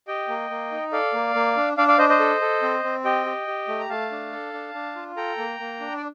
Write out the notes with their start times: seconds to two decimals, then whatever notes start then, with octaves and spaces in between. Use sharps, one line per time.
0.08 G4 D#5 G5
0.29 A#3
0.50 A#3
0.72 D#4
0.92 A4 D5 F5
1.14 A#3
1.35 A#3
1.57 D4
1.77 D4 D5 F5
1.88 D5 F5
1.98 D4 C5 D#5
2.09 C5 D#5
2.20 A4
2.41 A4
2.62 C4
2.84 C4
3.05 G4 D#5 G5
3.26 G4
3.47 G4
3.68 A3
3.80 A#5
3.89 A3 F5 A5
4.11 D4
4.32 A4
4.53 D4
4.74 D4
4.95 F4
5.17 A4 G5 A#5
5.38 A#3
5.60 A#3
5.80 D4
5.97 D5